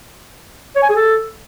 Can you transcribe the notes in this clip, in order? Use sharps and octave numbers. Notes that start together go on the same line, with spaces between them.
C#5
G#5
G#4
A4